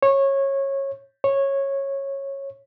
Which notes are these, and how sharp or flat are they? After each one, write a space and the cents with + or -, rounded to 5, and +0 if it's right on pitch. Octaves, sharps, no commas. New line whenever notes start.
C#5 -20
C#5 -15